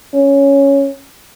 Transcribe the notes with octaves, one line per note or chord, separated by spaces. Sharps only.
C#4